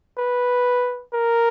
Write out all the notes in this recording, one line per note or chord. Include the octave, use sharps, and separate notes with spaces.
B4
A#4